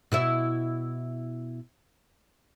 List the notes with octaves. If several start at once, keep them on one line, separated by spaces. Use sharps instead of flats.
B2 E4 E5